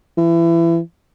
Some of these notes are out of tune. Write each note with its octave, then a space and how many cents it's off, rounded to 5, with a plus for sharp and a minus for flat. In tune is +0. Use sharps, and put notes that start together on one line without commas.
E3 +25